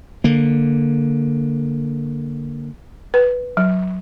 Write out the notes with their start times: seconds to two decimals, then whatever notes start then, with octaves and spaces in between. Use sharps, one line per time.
0.24 D3 A#3
3.14 B4
3.57 F#3